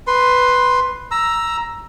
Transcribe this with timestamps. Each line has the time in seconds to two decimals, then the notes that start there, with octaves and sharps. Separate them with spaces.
0.07 B4 C6
1.11 A#5 E6